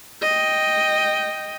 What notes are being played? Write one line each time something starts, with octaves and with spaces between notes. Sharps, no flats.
D#5 G5